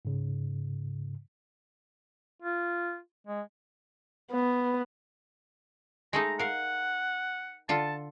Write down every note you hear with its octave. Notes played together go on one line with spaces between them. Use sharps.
G#2 C#3
F4
G#3
B3
G#3 A3 D#4 A#5
A#4 F5 F#5
D3 F4 A4 A5